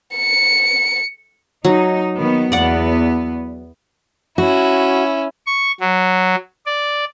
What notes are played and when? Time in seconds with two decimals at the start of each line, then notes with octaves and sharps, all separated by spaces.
0.17 C#7
1.65 F#3 D#4
2.17 D#3 B3
2.52 E2 B3 D5 F#5
4.38 C#4 E4 F#4
5.46 C#6
5.81 F#3
6.66 D5